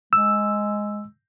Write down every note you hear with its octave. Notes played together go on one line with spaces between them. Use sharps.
G#3 E6